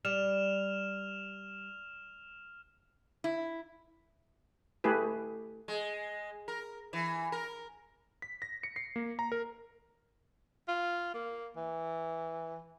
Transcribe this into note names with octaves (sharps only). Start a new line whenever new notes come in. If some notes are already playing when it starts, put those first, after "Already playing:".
G3 F6 E7 F7
E4
A3 E4 G4 G#4 B4
G#3
A#4
E3
A#4
B6
A#6
C#7
C7
A#3
A#5
A#4
F4
A#3
E3